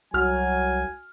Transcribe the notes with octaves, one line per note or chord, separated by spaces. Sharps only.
C2 F#3 F#4 G#5 F6